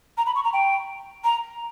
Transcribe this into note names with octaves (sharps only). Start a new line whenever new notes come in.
A#5
B5
C#6
A#5
G5
A#5